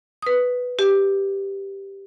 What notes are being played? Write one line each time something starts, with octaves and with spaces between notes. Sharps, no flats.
B4 D#6
G4